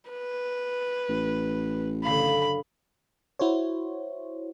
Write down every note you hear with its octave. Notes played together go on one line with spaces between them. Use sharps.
B4
A1
F#1 D3 F5 B5
E4 F#4 C5 C#5